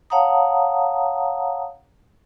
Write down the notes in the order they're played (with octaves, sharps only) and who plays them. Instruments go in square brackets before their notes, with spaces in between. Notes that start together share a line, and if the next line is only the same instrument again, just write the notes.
[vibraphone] C#5 F5 F#5 A5 A#5 D#6